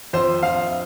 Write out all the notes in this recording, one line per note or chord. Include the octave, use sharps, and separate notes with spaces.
F2 C5
F2 F5